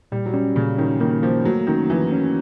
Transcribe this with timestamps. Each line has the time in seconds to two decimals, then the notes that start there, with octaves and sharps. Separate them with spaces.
0.12 A#2 G3
0.26 F#3
0.33 G3 C#4
0.56 A#2 C#3
0.78 D#3 C#4
1.00 D#3 A#3
1.23 F3 A#3
1.45 F#3 A3
1.67 D#3 C#4
1.89 E3 F3
2.12 C#4